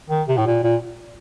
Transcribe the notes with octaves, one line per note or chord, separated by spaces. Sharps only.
D#3
C3
A2
A#2
A#2